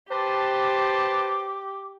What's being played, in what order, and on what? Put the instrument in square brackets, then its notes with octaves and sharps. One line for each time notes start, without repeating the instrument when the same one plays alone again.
[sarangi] G4 [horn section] B4 C5 A5 [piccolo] D6